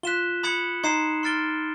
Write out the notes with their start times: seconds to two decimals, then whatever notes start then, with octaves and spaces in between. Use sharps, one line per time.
0.03 F4 F#6 B6 E7 G7
0.43 B5 D#6 G#6 C#7 F#7
0.84 D#4 C6 D#6 G#6 C7 E7
1.23 C6 F6 A6 D7 G7